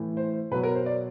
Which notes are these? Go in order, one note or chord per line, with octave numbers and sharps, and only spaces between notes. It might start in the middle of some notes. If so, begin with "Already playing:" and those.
Already playing: A2 E3
C5
B2 F#3 B4
A#4
C5
D5